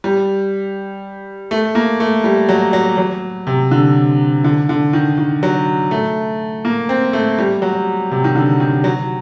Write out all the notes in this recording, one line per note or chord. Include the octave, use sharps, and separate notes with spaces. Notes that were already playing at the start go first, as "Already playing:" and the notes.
G3
A3
A#3
A3
G3
F#3
F#3
F#3
C3
D3
D3
D3
D#3
D#3
F#3
A3
A#3
C4
A3
G3
F#3
C3
D#3
D3
D#3
F#3